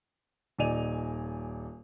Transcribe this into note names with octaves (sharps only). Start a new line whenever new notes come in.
D#1 D#4 D5 G#5 D#7 F7